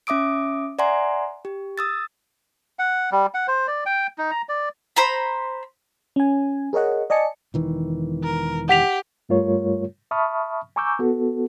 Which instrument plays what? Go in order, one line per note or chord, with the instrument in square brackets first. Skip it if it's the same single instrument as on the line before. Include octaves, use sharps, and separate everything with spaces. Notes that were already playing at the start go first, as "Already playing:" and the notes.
[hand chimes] C#4 E5 D6 D#6 D7
D5 E5 F#5 G#5 A#5 C6
G4
D#6 E6 A6
[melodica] F#5
G3
F#5
C5
D5
G5
D#4
A#5
D5
[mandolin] C5 A#5 B5
[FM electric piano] C#4 G#5
G#4 A#4 C#5 D#5 F#5
D5 D#5 G#5 A5 C#7
[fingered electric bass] E1 D#3 E3
[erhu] A#4
[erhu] G4 [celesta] F#5 B6 F7
[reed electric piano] G2 G3 A3 F4 A#4 C#5
E5 A5 B5 C#6 D#6 F6
G#5 A#5 C#6 D6 E6 G6
B3 F#4 A4